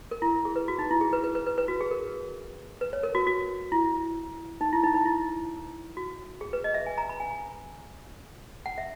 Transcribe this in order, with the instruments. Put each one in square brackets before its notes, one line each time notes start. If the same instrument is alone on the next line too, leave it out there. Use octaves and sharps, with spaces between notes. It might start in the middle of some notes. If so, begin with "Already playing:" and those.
[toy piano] A#4
E4
G#4
B4
F#4
D#4
E4
G#4
B4
B4
B4
B4
B4
F#4
G#4
A#4
B4
C#5
A#4
F#4
F#4
E4
D#4
E4
D#4
D#4
E4
F#4
G#4
B4
D#5
E5
G#5
A#5
B5
G#5
F#5
E5